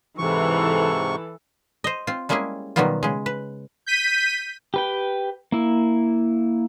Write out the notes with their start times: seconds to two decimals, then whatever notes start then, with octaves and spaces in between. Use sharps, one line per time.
0.18 G#2 C3 E3 A4 C#6
1.84 C5 D#5
2.07 C4 F4
2.29 G3 G#3 A#3 C#4 E4 G#4
2.76 B2 D#3 F#3 G3 B3 F4
3.03 C#3 G#3
3.26 B4
3.86 G6 B6 D#7
4.74 G4 B4 G5
5.52 A#3 E4